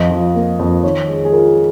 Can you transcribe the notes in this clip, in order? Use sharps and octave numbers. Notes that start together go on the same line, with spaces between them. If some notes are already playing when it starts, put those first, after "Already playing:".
Already playing: F2 D#5
F3
A#3
F2
D#3 C#5
G#3
G#4
F4 A#4